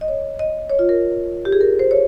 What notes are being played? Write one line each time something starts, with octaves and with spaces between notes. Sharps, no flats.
D#5
C#5
D#5
C#5
F4
A#4
G4
G#4
A#4
C5
C#5